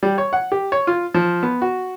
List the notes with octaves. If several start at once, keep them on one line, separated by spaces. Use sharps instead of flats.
G3
C#5
F#5
G4
C#5
F4
F3
B3
F#4